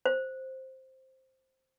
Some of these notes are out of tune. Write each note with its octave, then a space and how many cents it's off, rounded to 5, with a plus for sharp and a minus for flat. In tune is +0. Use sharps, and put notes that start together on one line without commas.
C5 +5